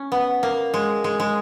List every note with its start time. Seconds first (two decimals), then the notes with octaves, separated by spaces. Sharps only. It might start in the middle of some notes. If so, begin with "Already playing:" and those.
Already playing: C#4
0.12 B3
0.43 A#3
0.74 G#3
1.04 G#3
1.20 G#3